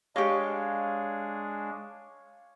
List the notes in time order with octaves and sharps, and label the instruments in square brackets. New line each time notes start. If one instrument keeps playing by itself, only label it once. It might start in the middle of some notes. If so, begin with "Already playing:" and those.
[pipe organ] G#3 D4 G#4 [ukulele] G4 D#5 [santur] C#5 F5